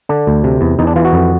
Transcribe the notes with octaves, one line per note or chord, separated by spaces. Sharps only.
D3 D4
D2
C3
E2
E2 D#4
D4
E3 F4
F#4
F2